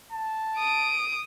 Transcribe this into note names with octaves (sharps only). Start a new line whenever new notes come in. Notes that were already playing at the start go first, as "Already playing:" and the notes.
A5
D#6 D7